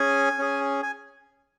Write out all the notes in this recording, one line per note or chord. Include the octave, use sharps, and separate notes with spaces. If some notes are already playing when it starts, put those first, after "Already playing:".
Already playing: C#4 G#4 G#5
C#4 G#4
G#5